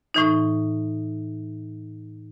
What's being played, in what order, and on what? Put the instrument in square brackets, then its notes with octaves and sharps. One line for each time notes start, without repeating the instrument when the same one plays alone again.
[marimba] A2 E3 D#4